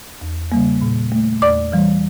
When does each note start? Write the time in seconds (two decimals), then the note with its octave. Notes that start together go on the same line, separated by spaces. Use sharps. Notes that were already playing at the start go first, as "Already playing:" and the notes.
0.21 E2
0.52 C#3 G3 A#3
0.81 A#2
1.12 A3
1.42 E2 D5 D6
1.72 E3 G3